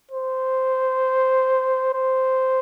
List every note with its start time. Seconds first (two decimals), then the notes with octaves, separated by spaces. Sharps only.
0.11 C5
1.94 C5